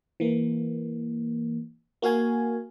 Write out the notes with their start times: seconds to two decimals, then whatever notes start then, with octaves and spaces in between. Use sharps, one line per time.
0.20 E3 A#3
2.02 A#3 F#4 F5 G#5